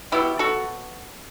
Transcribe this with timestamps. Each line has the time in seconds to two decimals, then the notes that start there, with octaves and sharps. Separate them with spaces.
0.12 B2 F#3 B3 E4 G4
0.39 F#4 A4